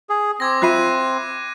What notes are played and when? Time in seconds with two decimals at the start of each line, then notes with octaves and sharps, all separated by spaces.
0.09 G#4
0.40 C4 D6 G#6 A#6
0.62 F4 E5 B5 F#6 C7 D#7